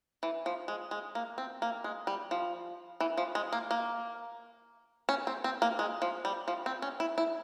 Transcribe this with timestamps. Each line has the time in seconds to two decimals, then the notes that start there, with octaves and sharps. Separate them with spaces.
0.23 E3
0.46 F3
0.68 G#3
0.91 G#3
1.15 A#3
1.38 C4
1.62 A#3
1.84 G#3
2.07 G3
2.31 F3
3.01 E3
3.17 F3
3.35 G#3
3.53 A#3
3.71 A#3
5.09 C#4
5.27 C4
5.44 C4
5.62 A#3
5.79 G#3
6.02 F3
6.25 G3
6.48 F3
6.66 C4
6.82 C#4
7.00 E4
7.18 E4